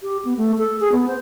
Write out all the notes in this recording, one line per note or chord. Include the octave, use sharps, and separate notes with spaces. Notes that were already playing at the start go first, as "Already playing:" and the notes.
G4
B3
A3
A4
G#4
B3
C5